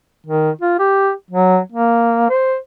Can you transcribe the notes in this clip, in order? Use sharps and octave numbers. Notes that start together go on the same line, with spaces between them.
D#3
F4
G4
F#3
A#3
C5